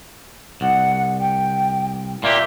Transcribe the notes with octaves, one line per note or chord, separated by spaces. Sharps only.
C2 F#5
G5
A#2 A#3 G4 E5